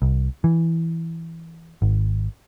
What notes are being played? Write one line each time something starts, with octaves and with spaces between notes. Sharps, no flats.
C2
E3
G#1